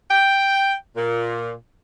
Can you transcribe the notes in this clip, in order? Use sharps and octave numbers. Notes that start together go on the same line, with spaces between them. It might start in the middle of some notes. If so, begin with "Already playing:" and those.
G5
A#2